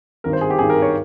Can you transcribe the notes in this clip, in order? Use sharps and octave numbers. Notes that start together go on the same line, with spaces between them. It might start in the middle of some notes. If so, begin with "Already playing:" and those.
G#1 G2 D#3 A#4
C5
G#4
G4
G#1 G2 D#3 G#4
A#4
C#5